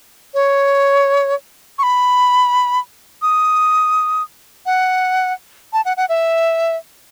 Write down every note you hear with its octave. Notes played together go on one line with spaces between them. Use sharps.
C#5
C#6
B5
D#6
F#5
A5
F#5
F#5
E5